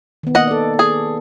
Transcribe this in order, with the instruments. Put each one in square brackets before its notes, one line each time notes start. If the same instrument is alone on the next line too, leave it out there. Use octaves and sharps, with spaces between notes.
[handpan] D#3 B3
[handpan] A#3 B3 [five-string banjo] D#5 F#5
[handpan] A4 D5
[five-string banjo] G#4